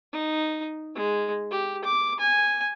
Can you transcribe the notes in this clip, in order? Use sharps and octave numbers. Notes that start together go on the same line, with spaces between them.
D#4
G#3
G4
D6
G#5